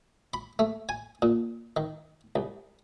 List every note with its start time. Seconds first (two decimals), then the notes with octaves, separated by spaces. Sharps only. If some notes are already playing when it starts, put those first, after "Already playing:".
0.34 B5
0.59 A3
0.89 G#5
1.22 A#2
1.77 D#3
2.36 C2